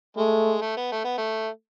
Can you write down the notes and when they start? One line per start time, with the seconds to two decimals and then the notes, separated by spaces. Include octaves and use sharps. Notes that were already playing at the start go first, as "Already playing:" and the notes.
0.17 G#3 A3
0.61 A3
0.77 B3
0.92 A3
1.05 B3
1.18 A3